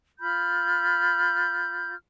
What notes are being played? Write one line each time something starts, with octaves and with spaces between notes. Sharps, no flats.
F4 B5 F6 G6